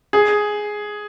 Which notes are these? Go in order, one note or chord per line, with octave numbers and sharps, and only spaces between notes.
G#4